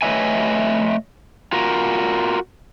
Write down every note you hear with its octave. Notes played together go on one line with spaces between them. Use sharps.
A3 B4 C#5 D#5 E5 G#5
F4 F#4 A#4